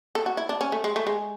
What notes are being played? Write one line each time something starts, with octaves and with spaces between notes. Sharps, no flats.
A4
F#4
E4
D4
C#4
A3
G#3
A3
G#3